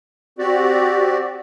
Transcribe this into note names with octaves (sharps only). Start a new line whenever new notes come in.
C4 F#4 G4 D5